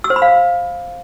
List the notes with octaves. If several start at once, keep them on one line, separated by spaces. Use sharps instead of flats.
E6
C5
B5
F5
C5